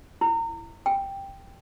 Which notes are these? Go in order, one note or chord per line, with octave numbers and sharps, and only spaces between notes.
E4
G5